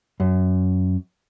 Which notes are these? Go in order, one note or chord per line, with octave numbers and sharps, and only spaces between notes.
F#2